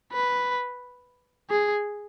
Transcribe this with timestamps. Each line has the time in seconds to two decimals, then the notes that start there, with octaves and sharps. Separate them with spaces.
0.12 B4
1.50 G#4